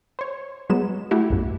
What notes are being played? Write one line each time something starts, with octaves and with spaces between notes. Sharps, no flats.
C5 C#5
F#3 G#3 B3 E7
A3 E4 F#4 G4
B1 F#2